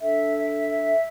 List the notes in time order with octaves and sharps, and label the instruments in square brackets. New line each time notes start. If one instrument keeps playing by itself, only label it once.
[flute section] D4 A4 E5